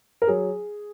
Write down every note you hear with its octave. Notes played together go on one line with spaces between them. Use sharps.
A#4
F#3 G#4